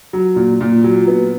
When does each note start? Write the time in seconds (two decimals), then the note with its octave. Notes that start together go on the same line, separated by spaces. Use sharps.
0.13 F#3
0.36 A#2
0.61 A#2
0.84 F#3
1.07 B3